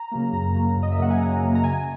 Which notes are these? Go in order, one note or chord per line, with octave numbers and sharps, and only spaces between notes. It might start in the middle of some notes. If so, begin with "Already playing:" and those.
Already playing: A#5
C#3 F#3 A#3
F#2 A#5
C#3 F#3 A#3
F#2
D#5
E5
C#3 F#3 A#3 F#5
G#5
F#2 A#5
C#3 F#3 A#3
A#5
C#3 G#5